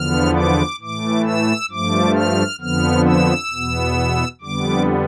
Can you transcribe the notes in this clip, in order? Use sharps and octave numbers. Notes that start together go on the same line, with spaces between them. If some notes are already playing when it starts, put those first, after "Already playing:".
Already playing: E2 D3 F3 B3 F6
D6
A2 E3 A3 D6
E6
G2 F3 A3 D6
F6
F2 D3 F3 B3 F6
E6
E2 B2 B3
F2 D3 G3 B3 D6